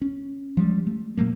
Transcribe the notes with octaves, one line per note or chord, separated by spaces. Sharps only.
C#4
F3 G3 G#3
A3
A#2 F#3 A3 A#3